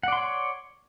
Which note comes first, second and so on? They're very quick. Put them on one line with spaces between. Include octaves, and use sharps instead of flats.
F#5 D5 C6 C#5